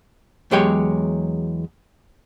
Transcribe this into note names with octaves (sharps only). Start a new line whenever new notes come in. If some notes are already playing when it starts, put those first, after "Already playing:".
E2 F#3 G#3 G4 C#5 G5